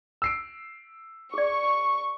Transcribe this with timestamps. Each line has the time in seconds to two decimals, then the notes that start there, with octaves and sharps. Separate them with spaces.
0.22 E6 C7 D7
1.34 G#4 D5 C#6